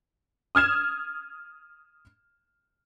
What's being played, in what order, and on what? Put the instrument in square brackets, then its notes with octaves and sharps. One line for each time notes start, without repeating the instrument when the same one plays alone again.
[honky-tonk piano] D#6 F6 G#6 E7